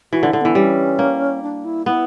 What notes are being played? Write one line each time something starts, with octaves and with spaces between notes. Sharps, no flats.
E3 F#4
D3 E4
D3
E3 B3
G3 C#4
A#3
D4
E4
B3 E4